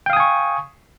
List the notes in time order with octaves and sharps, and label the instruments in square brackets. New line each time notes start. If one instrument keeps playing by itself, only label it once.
[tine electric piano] G5
F5
D#6
G#5
C#6